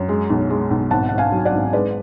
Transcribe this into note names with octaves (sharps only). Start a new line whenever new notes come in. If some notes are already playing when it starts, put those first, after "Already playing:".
Already playing: F#2
G#3
B1
G#3
B1
G#1 F#5 A5
G#1 F#5
F5 G#5
F#3
D5 F#5
G#1
G#3 B4 D5